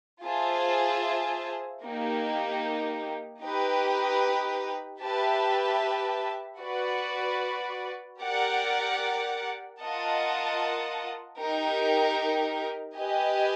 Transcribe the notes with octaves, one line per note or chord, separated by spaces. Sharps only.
F4 G#4 C5 E5 A5
A#3 D#4 G4
D#4 G4 B4
G4 B4 E5 A5
F#4 B4 D5
G4 A#4 D5 F#5
F4 A#4 D#5 F#5 A5
D#4 G4 A#4
G4 B4 D#5 G#5